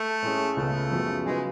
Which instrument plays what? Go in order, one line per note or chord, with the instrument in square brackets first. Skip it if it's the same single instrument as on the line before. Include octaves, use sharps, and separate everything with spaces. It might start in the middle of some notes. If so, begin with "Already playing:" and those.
Already playing: [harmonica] A3
[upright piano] A2 G#3 C#4
[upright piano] C#2 C#3 G#3 B3 [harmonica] A3
[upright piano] F#2 F3 G#3 B3 F#4
[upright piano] C#3 F#3 C#4 F4 B4 [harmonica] G#3